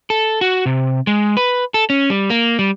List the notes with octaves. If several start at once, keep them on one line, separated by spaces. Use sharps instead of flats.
A4
F#4
C3
G#3
B4
A4
C#4
G3
A#3
G3